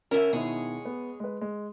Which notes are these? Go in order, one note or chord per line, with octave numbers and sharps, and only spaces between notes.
D3 C#4 E4 A#4 E5
B2 D#3 G#3 E4 G#4 C#5
B3
G#3 B4
G#3